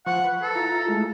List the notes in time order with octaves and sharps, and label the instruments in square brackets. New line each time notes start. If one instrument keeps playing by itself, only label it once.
[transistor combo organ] F3 C5 C#6 [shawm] F#5
[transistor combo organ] B4
[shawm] A4
[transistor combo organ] E4 F4 A#5
G#3 A3